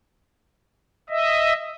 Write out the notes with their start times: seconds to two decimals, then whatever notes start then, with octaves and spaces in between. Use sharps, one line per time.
1.10 D#5 E5